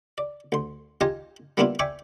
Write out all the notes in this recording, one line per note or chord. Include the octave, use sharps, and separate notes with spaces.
D5
D2 C6
D#4 F4 G4 D#5 G#5 A5
G3 A#3 B3 D4 E4 F4
D5 E5 G5 G#5 C#6 D6